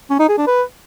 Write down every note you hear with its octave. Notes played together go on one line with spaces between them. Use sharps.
C#4
D#4
G#4
D4
B4